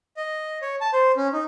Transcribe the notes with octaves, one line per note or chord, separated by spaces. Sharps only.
D#5
C#5
A5
C5
C#4
D#4